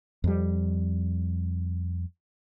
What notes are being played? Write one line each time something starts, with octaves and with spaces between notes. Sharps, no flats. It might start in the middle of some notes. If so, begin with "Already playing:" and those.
F2 G3